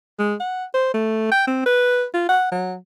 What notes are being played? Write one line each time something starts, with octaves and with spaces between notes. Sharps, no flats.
G#3
F#5
C5
A3
G5
C4
B4
F4
F#5
F#3